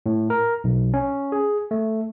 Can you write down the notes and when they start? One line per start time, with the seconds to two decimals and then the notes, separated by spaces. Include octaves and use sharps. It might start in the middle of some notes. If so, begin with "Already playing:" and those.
0.06 A2
0.30 A#4
0.64 B1
0.94 C#4
1.32 G#4
1.71 A3